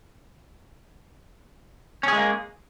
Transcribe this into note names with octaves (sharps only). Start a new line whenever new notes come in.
G#3 A#3 C#4 G#4